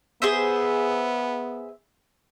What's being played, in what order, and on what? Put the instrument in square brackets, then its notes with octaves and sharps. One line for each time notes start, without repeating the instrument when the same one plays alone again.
[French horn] B3 [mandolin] G#4 C5 E5